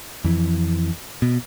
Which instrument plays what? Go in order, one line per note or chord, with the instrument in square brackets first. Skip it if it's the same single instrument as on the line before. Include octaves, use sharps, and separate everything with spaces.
[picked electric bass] F2 E3
B2